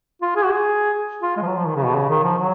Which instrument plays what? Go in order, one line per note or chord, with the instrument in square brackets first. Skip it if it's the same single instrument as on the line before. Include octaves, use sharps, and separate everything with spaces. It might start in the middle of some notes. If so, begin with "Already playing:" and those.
[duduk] F4
G#4
F#4
G#4
F4
G#3
F3
F#3
F3
D#3
C#3
B2
C#3
D#3
F3
F#3